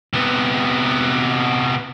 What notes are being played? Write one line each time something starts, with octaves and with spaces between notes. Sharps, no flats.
C3 B3